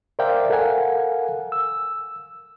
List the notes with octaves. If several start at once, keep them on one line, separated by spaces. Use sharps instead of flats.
A#4 C5 D5 E5 F5 G5
A4 A#4 F5 F#5 G#5
E6